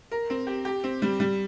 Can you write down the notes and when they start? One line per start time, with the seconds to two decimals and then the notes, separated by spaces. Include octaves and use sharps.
0.11 A#4
0.30 C4
0.47 G4
0.65 G4
0.84 C4
1.02 G3
1.20 G3